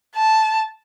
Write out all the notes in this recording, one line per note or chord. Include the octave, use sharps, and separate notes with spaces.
A5